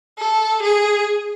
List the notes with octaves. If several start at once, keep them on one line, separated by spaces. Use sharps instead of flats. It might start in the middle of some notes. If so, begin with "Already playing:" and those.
A4
G#4